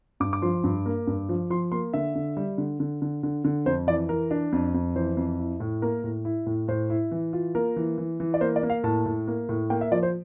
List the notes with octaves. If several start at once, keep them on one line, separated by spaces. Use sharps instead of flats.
G2 D6
D6
F3 C6
G2
A#3
G2
F3
F3 C6
A#3 C6
D3 E5
D3
G3
D3
D3
D3
D3
D3
F2 C5
E3 D5
E3 A#4
D4
F2
F2
E3 C5
F2
E4
A2
A#3 A#4
A2
E4
A2
A2 C5
E4
E3
F4
A#3 A#4
E3
E3
E3
D5
A#3 C5
D5
A#3
F5
A2 A5
A2
A#3
A2
A#3 G5
E5
F3 D5
C5